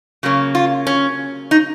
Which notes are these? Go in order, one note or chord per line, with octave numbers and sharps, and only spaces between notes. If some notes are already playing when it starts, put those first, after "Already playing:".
C#3 F#3 A#3 C#4
F4
C#4
D#4